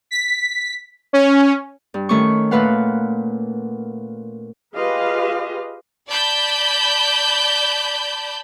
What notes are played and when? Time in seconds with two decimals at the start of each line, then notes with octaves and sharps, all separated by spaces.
0.11 B6
1.13 C#4
1.94 G2
2.09 D#3 A3 C#4 C#6
2.51 A#2 A3 B4 F5 F#5
4.75 F4 G4 G#4 B4 D#5 F5
6.08 D5 A5 B5 G6